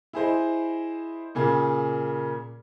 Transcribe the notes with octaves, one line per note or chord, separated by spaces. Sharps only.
E4 G#4 C5 D#5
A#2 C#3 G#4